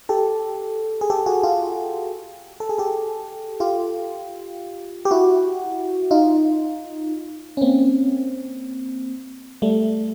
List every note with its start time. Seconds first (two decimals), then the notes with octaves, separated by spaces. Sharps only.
0.09 G4 A4
1.01 G#4
1.10 G4 A4
1.26 F#4 G#4
1.43 F4 G4
2.60 A4
2.69 G#4
2.78 G4 A4
3.60 F4 G4
5.05 G4
5.11 E4 F#4
6.11 D#4 F4
7.57 C#4
7.61 A#3 C4
9.62 G3 A3